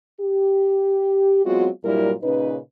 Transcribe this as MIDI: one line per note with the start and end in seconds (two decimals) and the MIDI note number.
0.20 1.41 67
1.44 1.68 54
1.44 1.68 56
1.44 1.68 59
1.44 1.68 60
1.44 1.68 65
1.44 1.68 66
1.83 2.11 43
1.83 2.11 46
1.83 2.11 54
1.83 2.11 55
1.83 2.11 64
1.83 2.11 70
2.22 2.57 46
2.22 2.57 49
2.22 2.57 61
2.22 2.57 63
2.22 2.57 71